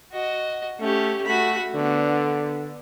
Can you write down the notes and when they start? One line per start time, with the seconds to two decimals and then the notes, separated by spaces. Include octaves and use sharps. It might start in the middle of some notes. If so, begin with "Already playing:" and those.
0.12 F#4 D#5
0.80 A3 C#4 G4
1.27 A3 F#4 B5
1.75 D3 B3